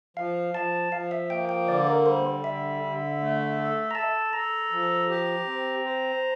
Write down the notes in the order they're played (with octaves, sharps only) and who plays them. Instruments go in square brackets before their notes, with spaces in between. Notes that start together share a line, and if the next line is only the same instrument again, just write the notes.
[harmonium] F3 [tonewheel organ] F5
[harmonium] F3 [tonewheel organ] A5
[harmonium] F3 [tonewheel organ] F5
[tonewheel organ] E5
[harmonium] A#3 [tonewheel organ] G5
[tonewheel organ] G5
[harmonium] D3 [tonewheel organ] D5
[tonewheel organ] A#4
[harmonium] G3 [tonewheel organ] C5
[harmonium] D3 [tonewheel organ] E5
[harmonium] D3
A3
A4
[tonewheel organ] A#5
[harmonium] A4 [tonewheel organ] A5
[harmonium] A4 [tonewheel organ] A#5
[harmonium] F3
G4
C4
C5